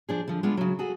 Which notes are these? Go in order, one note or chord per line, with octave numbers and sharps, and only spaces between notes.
F3 D4 G#4
D3 F3
G#3 B3 D4 F4
C#3 F#3
F#4 G#4 A4